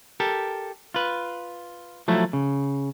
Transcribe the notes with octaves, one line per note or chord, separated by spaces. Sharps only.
G4 A4 A#4
F4 B4
F3 F#3 A3 E4
C#3